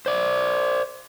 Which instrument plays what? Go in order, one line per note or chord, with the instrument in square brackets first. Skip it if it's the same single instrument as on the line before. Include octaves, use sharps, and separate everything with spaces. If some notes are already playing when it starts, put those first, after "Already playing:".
[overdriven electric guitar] C5 D5